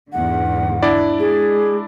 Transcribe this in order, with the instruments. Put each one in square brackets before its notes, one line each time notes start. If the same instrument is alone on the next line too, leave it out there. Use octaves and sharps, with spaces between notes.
[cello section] E2 G#2 D3 [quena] F#5
[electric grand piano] D4 E4 D5
[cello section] G#3 [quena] G#4